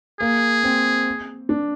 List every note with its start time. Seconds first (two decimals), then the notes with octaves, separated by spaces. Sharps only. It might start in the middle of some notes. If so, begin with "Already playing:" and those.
0.21 A#3 G#4
0.64 C4
1.49 D4